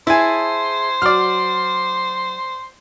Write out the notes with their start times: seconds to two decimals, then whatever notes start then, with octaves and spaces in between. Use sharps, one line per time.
0.07 E4 G#4 C5 E5 G#5 A5
1.02 F#3 D5 F6